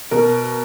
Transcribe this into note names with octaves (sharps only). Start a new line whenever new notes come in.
B2 A#4